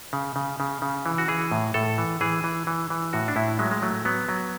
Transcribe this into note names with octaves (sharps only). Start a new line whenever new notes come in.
C#3
C#3
C#3
C#3
E3
F#4
E3 G#4
A2
A2 A4
E3
E3 G#4
E3
E3
E3
A2 F#4
D4
A2 E4
F#3 G#3
G#3
F#3 A3
F#3 B3
F#3